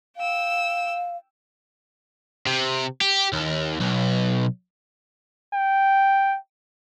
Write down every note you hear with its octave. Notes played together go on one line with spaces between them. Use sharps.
F5 G5 E6
C3
G4
D#2
B1
G5